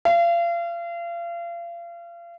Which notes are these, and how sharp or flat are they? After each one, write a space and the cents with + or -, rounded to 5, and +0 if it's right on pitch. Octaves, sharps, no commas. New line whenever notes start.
F5 -35